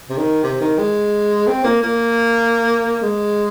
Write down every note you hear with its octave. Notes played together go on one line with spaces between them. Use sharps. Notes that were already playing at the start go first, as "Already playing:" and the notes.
C3
D#3
C3
D#3
G#3
C4
A#3
A#3
G#3